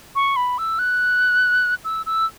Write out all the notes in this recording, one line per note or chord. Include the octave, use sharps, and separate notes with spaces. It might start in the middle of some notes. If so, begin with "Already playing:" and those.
C#6
B5
E6
F#6
E6
E6